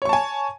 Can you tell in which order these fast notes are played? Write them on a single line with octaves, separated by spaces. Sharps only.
C#5 C#6 A5 G#5